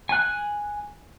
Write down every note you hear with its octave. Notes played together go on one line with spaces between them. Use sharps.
G#5 F#6